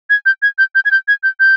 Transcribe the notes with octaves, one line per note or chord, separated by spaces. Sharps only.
G#6
G6
G#6
G6
G6
G#6
G6
G#6
G6
G6